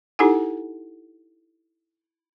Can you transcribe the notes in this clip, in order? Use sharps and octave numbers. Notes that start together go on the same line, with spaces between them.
D#4 E4 G4 A4 F#5 G#5